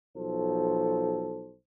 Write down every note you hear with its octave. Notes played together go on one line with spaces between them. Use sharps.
B1 F3 A4 C5